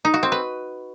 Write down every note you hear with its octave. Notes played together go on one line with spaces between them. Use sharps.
D#4
F#4
C4
B4